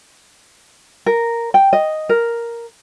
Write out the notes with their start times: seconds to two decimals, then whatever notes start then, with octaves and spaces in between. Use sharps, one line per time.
1.06 A#4
1.54 G5
1.73 D#5
2.09 A#4